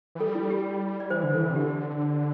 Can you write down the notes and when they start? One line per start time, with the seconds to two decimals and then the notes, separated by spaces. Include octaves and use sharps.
0.15 E3
0.20 G3 A4
0.35 E4
0.50 G4
1.00 D5
1.10 E3 C5
1.23 D3
1.34 E3 A4
1.50 C3
1.56 D3 G4